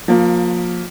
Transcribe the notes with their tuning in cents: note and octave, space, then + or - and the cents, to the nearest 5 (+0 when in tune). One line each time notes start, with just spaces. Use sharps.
F3 +25 A#3 +0